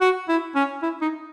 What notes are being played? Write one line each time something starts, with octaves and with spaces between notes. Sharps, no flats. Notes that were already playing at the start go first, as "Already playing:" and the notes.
F#4
E4
C#4
E4
D#4